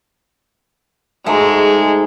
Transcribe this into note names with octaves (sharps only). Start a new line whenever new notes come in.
G#2 G#3 A3 F#4 A#5